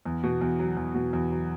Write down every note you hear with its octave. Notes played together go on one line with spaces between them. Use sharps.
E2
B2
E2
F#3
E2
B2
E2
F#3